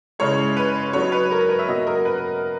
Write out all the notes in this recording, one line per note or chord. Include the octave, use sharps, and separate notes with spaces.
C#3 G#3 C#4 E4 C#5
B4
F#3 B3 D#4 C#5
B4
A#4
B4
E5
B2 F#3 A#3 D#5
A#4
B4